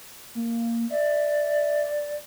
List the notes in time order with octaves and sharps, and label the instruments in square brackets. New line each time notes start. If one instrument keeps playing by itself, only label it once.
[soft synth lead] A#3
[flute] D5 [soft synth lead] E5